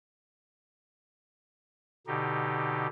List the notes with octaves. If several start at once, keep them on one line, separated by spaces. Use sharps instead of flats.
B2 D3 D#4 G4